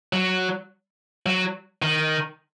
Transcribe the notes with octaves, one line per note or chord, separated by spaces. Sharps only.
F#3
F#3
D#3